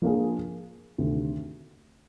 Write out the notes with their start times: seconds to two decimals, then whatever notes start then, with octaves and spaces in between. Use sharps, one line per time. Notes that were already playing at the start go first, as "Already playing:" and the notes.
0.02 F3 A#3 D4 F4 G#4
0.98 D2 C3 D#3